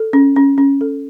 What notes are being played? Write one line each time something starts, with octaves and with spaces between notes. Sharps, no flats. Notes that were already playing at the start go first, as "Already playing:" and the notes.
Already playing: A4
C#4
C#4
C#4
A4